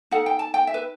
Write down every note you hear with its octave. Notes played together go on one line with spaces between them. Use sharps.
D#4 A4 F#5
G5
A5
G5
E5
B4